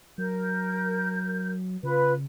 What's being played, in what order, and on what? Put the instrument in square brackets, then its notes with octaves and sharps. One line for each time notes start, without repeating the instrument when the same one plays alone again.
[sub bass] F#3 [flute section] A#4 G6
[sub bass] C#3 [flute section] F4 B4